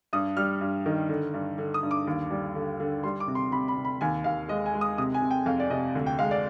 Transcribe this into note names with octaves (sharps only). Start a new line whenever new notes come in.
G2 D#6
G3 F6
G2
D#3
D3
G2
D3
D#6
G2
D6
D#2
G3
D3
D3
G3 C6
D6
C3
C6
C3 B5
B5
C3
B5
D#2 G#5
D#2 F5
G#3 D#5
G#5
G#3
D#6
C3 D#6
G#5
C3
G5
F2 F5
D5
C3 D#5
D2
G5
G#3 F5
D5